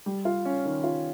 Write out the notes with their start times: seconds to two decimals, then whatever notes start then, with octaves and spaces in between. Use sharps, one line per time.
0.06 G3
0.25 F4
0.45 C#4
0.65 D#3
0.84 F4